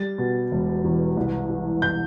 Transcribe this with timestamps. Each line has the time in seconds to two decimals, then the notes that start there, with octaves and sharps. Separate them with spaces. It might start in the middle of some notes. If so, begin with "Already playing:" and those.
Already playing: G3 A6
0.18 B2
0.52 E1
0.84 E2
1.17 C2
1.49 E3
1.82 G6